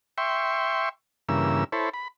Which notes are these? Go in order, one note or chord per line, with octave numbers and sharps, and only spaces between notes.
E5 G5 C6 C#6
G2 C#3 E3 A#3 E6
E4 A4 C5 C#5 B5
B5